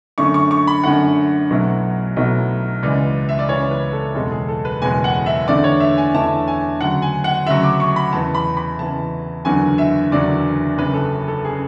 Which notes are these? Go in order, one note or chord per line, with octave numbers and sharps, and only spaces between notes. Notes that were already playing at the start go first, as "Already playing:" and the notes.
F#2 D3 A3 C#6
C#6
C#6
B5
F#2 D3 A3 F#5
B1 B2 F#3 A3 E4
B1 B2 F#3 A3 E4
C#2 C#3 E3 D5
E5
D5
C#2 C#3 E3 C#5
B4
A4
F#1 E2 B2 G#3 A4
G#4
A4
B4
F#1 E2 B2 G#3 G#5
F#5
E5
E2 D3 A3 E4 D5
C#5
E5
G#5
E2 D3 A3 E4 A5
G#5
D2 C#3 F#3 F#5
G#5
F#5
D2 C#3 F#3 E5
D6
C#6
B5
E2 C#3 E3 A5
B5
B5
E2 C#3 E3 A5
F#1 E2 D3 F#3 G#5
E5
F#1 E2 D3 F#3 D5
F#1 F#2 C#3 B4
A4
A4
C#3 G#4